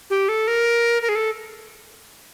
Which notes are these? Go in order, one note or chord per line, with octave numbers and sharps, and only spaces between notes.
G4
A4
A#4
A#4
G#4
A4